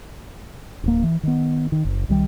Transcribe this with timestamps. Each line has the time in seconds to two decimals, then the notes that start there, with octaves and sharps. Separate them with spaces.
0.83 D1 A#3
1.03 E3
1.23 D#3 B3
1.72 D#3
1.85 F#1
2.09 C2 D#3 G3